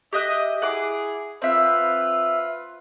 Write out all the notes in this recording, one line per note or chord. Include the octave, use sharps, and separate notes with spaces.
G4 D#5 E5 F#6
E4 G#4 F#5 D6
C4 F4 B4 E5